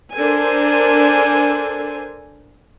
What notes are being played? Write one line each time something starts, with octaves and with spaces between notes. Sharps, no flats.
D4 A4 A#4 C5 G#5